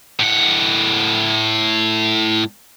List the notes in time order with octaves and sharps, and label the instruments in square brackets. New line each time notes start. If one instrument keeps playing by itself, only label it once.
[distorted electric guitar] A2 F#5